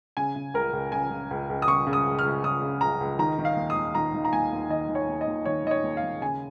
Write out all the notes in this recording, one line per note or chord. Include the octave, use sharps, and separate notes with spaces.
C#3 G#5
C#3
C#2 A#4
C#2
C#3 G#5
C#3
C#2
C#2
D#6
C#3 C#6
C#3
D#6
C#2
F6
C#2
C#3 D#6
C#3
C#2 A#5
C#2
D#3 A#5
D#3
F5
D#2
D#6
D#2
D#3 A#5
D#3
A#5
D#2 G#5
D#2
D#3 D#5
D#3
C#5
D#2
D#5
D#2
D#3 C#5
D#3 D#5
C#5
D#2
F5
D#2
C#3 G#5